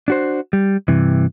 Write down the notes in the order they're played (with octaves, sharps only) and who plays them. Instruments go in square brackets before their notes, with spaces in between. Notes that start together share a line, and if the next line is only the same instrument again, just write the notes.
[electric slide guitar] D4 F#4 C5
G3
G2 C3 E3